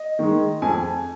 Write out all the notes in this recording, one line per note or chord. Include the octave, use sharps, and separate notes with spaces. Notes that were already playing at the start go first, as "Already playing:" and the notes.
Already playing: D#5
D#3 G#3
F2 G#5